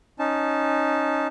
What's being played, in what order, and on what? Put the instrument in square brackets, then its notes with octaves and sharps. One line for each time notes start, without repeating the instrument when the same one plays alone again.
[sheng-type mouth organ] C#4 D#4 A5